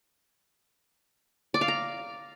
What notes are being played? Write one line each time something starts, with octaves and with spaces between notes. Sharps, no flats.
D5
F5
A#5